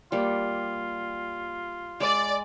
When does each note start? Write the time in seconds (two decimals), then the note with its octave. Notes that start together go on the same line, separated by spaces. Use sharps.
0.12 G3 A#3 F4
2.00 G#3 D5